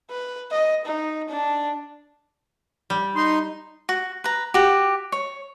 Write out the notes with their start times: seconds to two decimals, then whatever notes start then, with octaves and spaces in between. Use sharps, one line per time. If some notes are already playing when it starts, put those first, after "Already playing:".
0.10 B4
0.51 D#5
0.85 D#4
1.29 D4
2.90 G3
3.16 D#4 C6
3.89 F#4
4.24 B4 A#5
4.54 F#4 G4
5.12 C#5